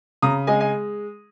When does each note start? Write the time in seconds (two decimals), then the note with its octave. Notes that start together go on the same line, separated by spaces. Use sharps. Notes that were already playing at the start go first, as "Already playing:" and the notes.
0.22 C#3 A#5 D#6
0.47 G#3 D#5 G#5
0.60 D#5 G#5